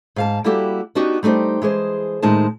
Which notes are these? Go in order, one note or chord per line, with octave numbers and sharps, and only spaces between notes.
G#2 F5 A5
G3 A#3 E4 F#4 G4 A4
B3 D4 D#4 F#4 G4
G3 A3 D#4 G4 C5
E3 G#3 G#4 C5
A2 D#3 G#3 D#4 C5 A5